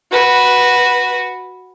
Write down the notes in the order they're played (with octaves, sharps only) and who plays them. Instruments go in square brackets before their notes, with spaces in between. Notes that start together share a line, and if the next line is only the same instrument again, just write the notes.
[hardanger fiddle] F#4 B4